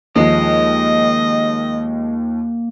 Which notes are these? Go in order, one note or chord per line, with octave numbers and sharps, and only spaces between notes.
D#2 F3 G#3 A#3 D#5